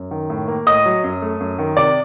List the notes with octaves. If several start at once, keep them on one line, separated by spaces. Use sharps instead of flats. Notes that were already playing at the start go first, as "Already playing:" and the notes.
Already playing: F#2
D#3
A2
A#3
A2 D#5 D#6
F#3
F#2
A3
F#2
D#3
C3 D5 D6